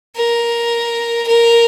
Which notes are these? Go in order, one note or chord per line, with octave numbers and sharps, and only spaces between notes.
A#4
A#4